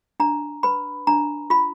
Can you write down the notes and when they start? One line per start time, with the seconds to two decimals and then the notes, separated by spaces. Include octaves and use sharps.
0.20 D4 A#5
0.63 B4 B5
1.07 D4 A#5
1.50 F4 B5